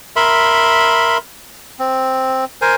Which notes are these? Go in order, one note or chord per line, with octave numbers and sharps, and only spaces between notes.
A#4 E5 B5 C6
C4
A#4 C5 G#5